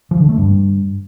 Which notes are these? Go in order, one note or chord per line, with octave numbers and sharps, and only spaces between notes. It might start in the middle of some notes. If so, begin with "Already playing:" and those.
F3
D3
A3
G2